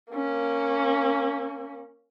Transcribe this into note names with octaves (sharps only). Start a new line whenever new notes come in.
A#3 C#4